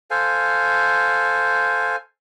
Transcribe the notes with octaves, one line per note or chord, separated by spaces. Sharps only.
A4 C5 F5 G#5